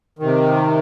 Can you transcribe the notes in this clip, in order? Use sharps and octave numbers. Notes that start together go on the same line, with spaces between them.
C3 D#3